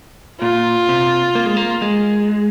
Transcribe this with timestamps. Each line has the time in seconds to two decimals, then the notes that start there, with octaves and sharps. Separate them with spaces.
0.41 A#2 F4
0.89 C3
1.35 A#3
1.46 G#3
1.57 A#3
1.82 G#3